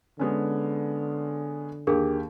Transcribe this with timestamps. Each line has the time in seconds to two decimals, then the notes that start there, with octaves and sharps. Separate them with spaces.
0.19 D3 G#3 B3 C#4
1.87 D#2 D4 G4 G#4 A#4